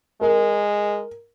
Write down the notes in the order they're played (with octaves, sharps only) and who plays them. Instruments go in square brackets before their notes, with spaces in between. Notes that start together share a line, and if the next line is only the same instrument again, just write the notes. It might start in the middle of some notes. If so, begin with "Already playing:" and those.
[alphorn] G#3 [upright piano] A#4